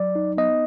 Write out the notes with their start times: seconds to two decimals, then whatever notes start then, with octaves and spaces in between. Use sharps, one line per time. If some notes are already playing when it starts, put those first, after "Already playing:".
Already playing: F#3 D5
0.15 D#4
0.38 B3 D#5